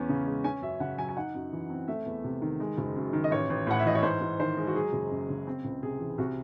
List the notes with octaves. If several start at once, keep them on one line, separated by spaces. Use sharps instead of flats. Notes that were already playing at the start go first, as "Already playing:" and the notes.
Already playing: E2 C#4
C#3
G#3
C#4 G#5
F#2 E5
C#3 F#5
F#3 G#5
G#5
D#4 F#5
F#2
E3
C4
A3 E5
E2
C3
D#3
G#3
F#1
F#2
D#3
D#5
A1 C#5
A1
A2 F#5
E5
E3 D#5
C#5
G#2 C5
G#2
D#3 C5
G#3
F#4
F#3 G#4
F#1
F#2
C#3
C4
C#2
C3 G#4
E3
C2 F#4